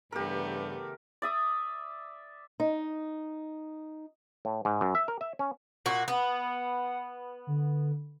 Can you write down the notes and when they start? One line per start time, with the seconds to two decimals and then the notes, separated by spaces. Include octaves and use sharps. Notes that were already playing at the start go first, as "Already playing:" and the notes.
0.12 G2 C#3 E3 A3 B3 G4 A#4
1.22 D5 E5 D#6
2.60 D#4
4.45 A2
4.65 G#2
4.81 F#2
4.95 E5
5.08 A#4
5.21 E5
5.39 C#4
5.86 A#2 F#4
6.08 B3 F#5
7.47 D3